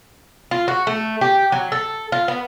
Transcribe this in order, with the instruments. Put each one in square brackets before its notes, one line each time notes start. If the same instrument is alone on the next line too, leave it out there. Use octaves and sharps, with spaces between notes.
[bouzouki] F4
F#4
A3
G4
F#3
A4
F4
B3